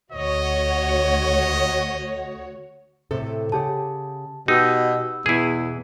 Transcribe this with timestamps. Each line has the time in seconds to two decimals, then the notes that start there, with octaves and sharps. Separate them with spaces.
0.12 D2 F#4 C#5 D#5
3.11 A2 C3 A4
3.52 C#3 G4 F#5 A5
4.48 B2 D#4 G4 E6
5.26 E2 B2 E4 G#4